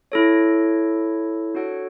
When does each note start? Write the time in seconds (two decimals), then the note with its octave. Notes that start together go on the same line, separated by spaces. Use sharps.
0.12 E4 A4 C#5
1.54 D4 F#4 A4 C#5 F#5